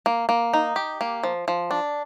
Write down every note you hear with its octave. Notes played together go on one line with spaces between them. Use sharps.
A#3
A#3
D#4
G4
A#3
F3
F3
D4